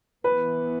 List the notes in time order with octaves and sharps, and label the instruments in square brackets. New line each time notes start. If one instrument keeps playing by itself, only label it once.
[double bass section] E3 B3 [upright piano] B4